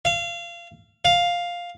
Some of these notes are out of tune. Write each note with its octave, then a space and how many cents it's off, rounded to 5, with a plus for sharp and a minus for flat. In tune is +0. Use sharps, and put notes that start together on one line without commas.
F5 -25
F5 +5